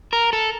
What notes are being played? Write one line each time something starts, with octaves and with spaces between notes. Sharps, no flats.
A#4
A4